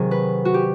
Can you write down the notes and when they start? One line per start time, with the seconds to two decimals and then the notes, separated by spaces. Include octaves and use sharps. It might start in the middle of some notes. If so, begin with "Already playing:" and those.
Already playing: C3 D#3 F#3 G#4
0.11 B4
0.45 F#4
0.54 G4